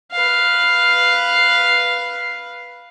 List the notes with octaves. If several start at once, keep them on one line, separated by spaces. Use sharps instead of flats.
B4 F5